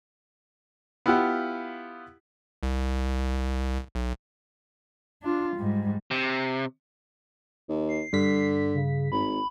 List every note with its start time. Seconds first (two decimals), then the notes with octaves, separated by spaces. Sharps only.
1.06 B3 E4 F4 G4 F5 F#5
2.63 C2
3.95 B1
5.23 D4 F4
5.56 G#2 G3
6.11 C3
7.69 D#2
7.89 C7
8.13 G2 D3 B6
8.74 C#3
9.12 G#1 B5